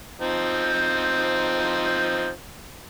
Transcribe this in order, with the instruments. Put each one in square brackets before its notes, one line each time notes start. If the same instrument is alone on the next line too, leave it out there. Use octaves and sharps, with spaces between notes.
[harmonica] F3 C4 D#4